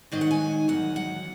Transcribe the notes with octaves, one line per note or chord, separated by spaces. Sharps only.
G#2 D#3 F#3 D#5
F#5
G#5
E2 D#3 F#3 F#5
F#5